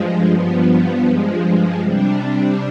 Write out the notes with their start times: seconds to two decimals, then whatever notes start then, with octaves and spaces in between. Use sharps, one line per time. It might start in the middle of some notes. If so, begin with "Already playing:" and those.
Already playing: G2 F3 G#3
0.32 G2 F3 B3
1.06 G2 F3 G#3
1.80 C3 G3 D4